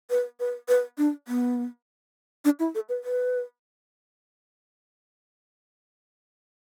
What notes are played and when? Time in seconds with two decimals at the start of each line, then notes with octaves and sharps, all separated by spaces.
0.10 B4
0.40 B4
0.69 B4
0.98 D4
1.28 B3
2.45 D4
2.59 E4
2.75 A4
2.89 B4
3.04 B4